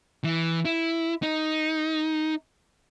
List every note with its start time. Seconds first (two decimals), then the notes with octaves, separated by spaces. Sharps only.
0.24 E3
0.65 E4
1.22 D#4